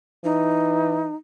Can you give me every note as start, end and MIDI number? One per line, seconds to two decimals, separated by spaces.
0.24 1.10 52
0.24 1.15 63